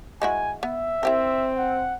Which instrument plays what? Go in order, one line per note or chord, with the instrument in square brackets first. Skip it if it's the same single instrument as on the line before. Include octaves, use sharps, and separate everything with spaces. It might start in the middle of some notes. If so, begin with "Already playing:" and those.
[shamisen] G#3 E4 F#4 [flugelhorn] G#5
[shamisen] B3 [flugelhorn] E5
[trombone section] C4 [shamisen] E4 G4 A#4
[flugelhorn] F#5